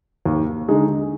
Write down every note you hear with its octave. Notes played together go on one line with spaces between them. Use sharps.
D#2
D3 G#3 D#4